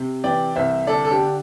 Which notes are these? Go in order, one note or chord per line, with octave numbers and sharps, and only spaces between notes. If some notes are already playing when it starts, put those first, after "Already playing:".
Already playing: C3
E3 D5 G5
C2 C5 E5
D3 A4 D5
A4
D4 G4
D3